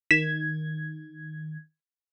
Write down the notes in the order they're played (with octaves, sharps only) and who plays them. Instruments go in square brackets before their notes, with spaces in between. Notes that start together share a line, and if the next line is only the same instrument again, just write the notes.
[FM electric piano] D#3 G#6 [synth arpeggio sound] B6 E7